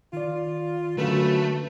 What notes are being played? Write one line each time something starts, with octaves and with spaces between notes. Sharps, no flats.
D#3 F4 D5
F#2 D3 A3 B4